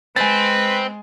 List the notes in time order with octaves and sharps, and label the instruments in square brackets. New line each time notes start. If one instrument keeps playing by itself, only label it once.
[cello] G#3 [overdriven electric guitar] C4 [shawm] B4 [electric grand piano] G#5 A6